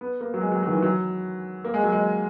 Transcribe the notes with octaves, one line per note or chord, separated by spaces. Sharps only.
B3
A#3
F#3
G#3
F#3
F#3
D#3
E3
F#3
A#3
G#3
F#3
G#3